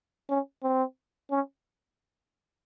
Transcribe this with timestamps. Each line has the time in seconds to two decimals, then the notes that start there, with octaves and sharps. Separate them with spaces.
0.29 C#4
0.63 C4
1.30 C#4